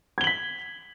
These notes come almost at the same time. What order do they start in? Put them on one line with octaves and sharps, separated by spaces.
G#6 G7 F#7 B6